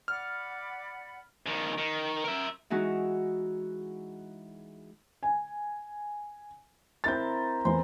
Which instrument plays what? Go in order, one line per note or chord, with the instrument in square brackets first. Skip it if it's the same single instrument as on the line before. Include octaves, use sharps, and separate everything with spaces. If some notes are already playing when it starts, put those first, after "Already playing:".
[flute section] D5 F#5 B5 [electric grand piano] F6
[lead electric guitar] G2 D#3
D#3
A#4 E5
[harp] E3 G#3 D#4 E4 F#4
[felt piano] G#5
[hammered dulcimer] C4 E4 A#4 [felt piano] G6 A6
[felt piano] E2 [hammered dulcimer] C5